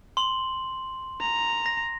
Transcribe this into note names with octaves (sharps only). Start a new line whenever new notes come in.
C6 F#7
A#5
A#6